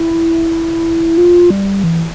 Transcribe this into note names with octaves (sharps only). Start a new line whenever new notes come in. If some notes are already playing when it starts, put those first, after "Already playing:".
Already playing: E4
F4
G3
E3